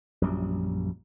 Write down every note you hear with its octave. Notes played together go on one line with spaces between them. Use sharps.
A#1 F#2 G3